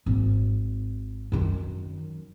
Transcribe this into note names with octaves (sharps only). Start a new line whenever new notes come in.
G#1
F#2 D#3